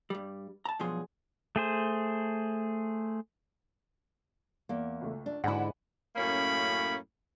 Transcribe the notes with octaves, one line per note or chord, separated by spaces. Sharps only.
G2 G3
A5 A#5
G2 B2 F3 F#3 G#4 C6
A3 G#4 C5
E2 A#3
C#2 A3
D4
G#2 D3 E4 F#5 G#5 B5
F#2 A2 A#3 C#4 B5